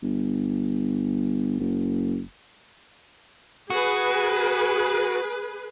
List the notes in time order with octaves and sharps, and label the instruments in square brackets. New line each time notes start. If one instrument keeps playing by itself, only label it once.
[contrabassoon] G1
F#1
[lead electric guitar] F#4 [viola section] G#4 B4